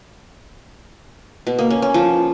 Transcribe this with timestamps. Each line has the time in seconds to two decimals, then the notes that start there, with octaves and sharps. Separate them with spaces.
1.47 B2
1.59 A#3
1.70 C#4
1.82 C#4
1.94 F3